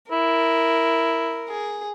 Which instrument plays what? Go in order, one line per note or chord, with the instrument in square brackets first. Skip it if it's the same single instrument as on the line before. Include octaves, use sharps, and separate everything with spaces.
[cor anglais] E4 [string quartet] A#4
[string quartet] G#4